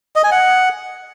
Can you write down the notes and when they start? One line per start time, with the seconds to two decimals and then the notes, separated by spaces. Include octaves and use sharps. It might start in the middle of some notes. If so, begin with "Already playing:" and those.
0.16 D#5
0.24 G#5
0.32 F#5